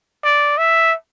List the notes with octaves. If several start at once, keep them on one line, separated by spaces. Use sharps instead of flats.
D5
E5